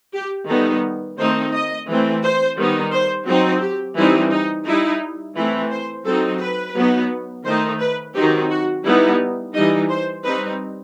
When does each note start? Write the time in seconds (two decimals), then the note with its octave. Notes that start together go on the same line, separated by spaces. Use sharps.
0.14 G4
0.48 D#3 G3 B3 D#4 A4
1.18 D#3 A3 C4 D#4 C5
1.53 D#5
1.88 E3 A3 C4
2.23 C5
2.58 D#3 G3 B3 D#4
2.92 C5
3.27 F#3 C4 D#4
3.62 G4
3.96 E3 G3 C4 D#4 E4
4.31 D#4
4.67 G3 D#4 E4
5.36 E3 A3 C4 E4
5.71 C5
6.05 F#3 C4 D#4 A4
6.40 B4
6.75 F#3 B3 D#4
7.45 D#3 A3 D#4 C5
7.80 B4
8.15 D#3 F#3 C4 D#4 G4
8.50 F#4
8.85 G3 B3 D#4 E4
9.54 E3 G3 D#4 D#5
9.89 C5
10.24 G3 C4 D#4 B4